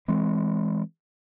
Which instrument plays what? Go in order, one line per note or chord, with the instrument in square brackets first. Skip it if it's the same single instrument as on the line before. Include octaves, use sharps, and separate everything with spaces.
[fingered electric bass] E3 G#3 C4